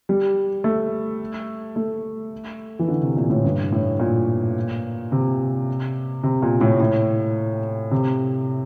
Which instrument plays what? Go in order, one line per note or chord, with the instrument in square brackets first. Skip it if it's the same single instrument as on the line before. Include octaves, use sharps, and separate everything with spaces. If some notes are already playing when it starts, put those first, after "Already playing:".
[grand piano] G3
A3
A3
E3
D3
C3
A#2
A2
G2
A2
A#2
C3
C3
A#2
A2
A2
C3